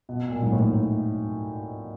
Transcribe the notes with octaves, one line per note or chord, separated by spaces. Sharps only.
B2
A#2
G#2
A2